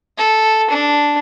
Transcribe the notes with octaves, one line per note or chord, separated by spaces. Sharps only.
A4
D4